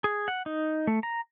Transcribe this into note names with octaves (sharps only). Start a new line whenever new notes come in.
G#4
F#5
D#4
A3
A#5